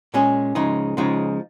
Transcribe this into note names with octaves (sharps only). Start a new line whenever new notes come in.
A#2 G#3 C#4 G#4
C#2 C#3 F3 G#3 D#4
C#2 C#3 F3 G#3 D#4